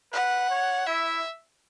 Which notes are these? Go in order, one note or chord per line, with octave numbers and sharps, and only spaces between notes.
B4 F#5
C#5
E4 E5